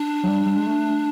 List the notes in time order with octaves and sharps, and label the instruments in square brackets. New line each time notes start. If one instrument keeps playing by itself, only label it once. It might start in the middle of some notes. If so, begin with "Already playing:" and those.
Already playing: [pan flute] D4
[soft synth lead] F#3
G3
G3
G#3
A3